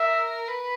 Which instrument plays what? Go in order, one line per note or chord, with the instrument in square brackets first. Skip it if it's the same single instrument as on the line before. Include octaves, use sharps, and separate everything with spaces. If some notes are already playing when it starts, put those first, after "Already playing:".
Already playing: [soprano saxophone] A#4 [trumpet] E5
[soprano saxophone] B4